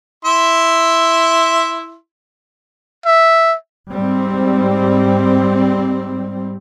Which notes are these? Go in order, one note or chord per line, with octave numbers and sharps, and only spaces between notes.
E4 E5 C6
E5
G#2 G3 C4